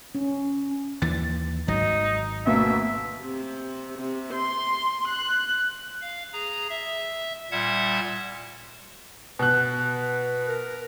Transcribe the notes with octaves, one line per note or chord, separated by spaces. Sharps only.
C#4
D#2 E3 A6
G#1 F#3 D#4
D2 B2 A#3 E5
C3
C3
C6
F#6
F5
G#4 A#5
E5
A#2 G3 E5 F#5 A5 G#6
B2 B4 F#6
A#4